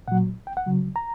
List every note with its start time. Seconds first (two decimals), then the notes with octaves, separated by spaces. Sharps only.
0.08 A#2 F#3 F#5
0.47 G5
0.57 F#5
0.66 C#3 F#3
0.96 A#5